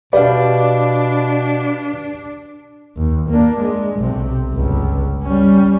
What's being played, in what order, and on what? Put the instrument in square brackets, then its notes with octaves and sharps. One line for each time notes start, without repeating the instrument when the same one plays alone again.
[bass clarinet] B2 [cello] D4 [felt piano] G4 D5 [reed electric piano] B4 F5
[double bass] D#2
A#3 D4
G#3
B1 C3
G1 C#2
G3 C#4